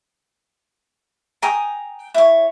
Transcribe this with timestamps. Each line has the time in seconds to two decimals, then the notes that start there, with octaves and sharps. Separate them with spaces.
1.42 G5 G#5 A#5 D#6
2.14 E4 C#5